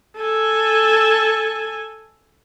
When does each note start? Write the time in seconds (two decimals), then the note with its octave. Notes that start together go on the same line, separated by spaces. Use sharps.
0.18 A4 G#5